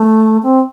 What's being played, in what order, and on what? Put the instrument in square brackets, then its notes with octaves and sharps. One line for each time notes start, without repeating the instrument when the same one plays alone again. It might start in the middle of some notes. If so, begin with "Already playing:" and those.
Already playing: [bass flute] A3
C4